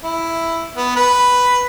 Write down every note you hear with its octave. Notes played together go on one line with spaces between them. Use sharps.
E4
B3
B4